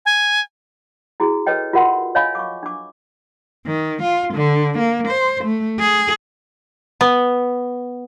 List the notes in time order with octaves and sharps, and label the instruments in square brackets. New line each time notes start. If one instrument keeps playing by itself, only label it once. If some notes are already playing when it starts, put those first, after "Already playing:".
[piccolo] G#5
[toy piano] E4 F#4 G#4
A4 B4 C#5 D#5 G5
F4 F#4 A#4 E5 F#5 C6
C#5 D#5 F5 G#5 B5
C#6 D6
D4 D6
[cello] D#3
F4
D3
A#3
C5
A3
G#4
[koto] B3